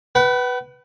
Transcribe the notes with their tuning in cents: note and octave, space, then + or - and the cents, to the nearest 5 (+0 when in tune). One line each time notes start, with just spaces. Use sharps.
B4 +0 F#5 +45